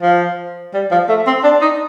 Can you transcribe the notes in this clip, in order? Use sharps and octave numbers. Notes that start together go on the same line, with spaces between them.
F3
G3
F3
A3
C4
D4
D#4